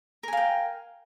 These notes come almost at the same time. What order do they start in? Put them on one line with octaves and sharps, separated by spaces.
A#4 G#5 F5 G5